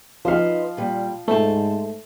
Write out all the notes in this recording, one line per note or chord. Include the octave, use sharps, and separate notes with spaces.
F3 D#4 B4 C5 F5
A#2 G3
G#2 A3 C5 A5